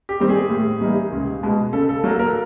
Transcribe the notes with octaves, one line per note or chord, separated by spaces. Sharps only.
G4
D#3 G3 C4
G#4
A2
E3 G3 A#3 D#4
C#2
B2 G#3
C#3 A4
A4
F#3 A#3 A4
A#4